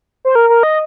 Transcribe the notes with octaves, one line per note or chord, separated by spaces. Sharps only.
C5
A#4
A#4
D#5